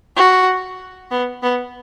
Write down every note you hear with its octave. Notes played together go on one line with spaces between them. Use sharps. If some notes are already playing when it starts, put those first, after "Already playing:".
F#4
B3
B3